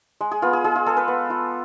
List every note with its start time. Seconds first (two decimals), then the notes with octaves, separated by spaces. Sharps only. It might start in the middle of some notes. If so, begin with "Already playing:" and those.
0.21 G#3
0.31 G#4
0.42 B3 F4
0.53 G#4
0.64 G#3 G#4
0.76 F4
0.86 G#3 A4
0.97 B4
1.08 B3
1.30 F4